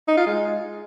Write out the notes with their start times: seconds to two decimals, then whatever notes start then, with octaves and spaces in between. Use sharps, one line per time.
0.08 D#4
0.17 F4
0.26 G#3